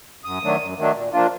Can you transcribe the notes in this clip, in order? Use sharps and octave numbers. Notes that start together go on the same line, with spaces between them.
F#2 D#6
D#3 F#3 A3 D4
F#2
D#3 F#3 A3 D4
A#2
F3 A#3 D4 F4